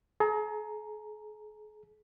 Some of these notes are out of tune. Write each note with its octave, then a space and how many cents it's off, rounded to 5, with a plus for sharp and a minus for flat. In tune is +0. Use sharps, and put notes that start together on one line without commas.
G#4 +45 A#5 +0